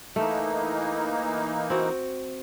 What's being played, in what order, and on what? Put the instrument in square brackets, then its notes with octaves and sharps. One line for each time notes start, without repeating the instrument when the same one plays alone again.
[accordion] E3 A#3 D#4 [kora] A3
[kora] C4 F#4